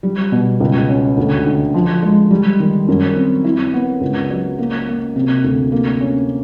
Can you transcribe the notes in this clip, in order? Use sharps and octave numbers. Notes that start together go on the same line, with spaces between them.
G3
B2
C#2
C#4
D2
D3
F3
G#3
G3
D#3
F#2
C4
E4
B3
C#2
F#3
A#3
A#3
C3
D2
A#3
C#4